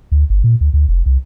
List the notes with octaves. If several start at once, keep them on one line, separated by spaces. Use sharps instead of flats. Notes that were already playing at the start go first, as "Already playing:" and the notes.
D2
G1
A#2
D2
D2
F1
C2